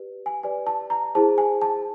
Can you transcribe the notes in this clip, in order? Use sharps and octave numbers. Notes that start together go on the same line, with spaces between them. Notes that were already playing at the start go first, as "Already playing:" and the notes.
Already playing: G4 B4 D5
G#5
G4 B4 D5 G#5
A5
A#5
E4 G#4 C5 A5
G#5
A5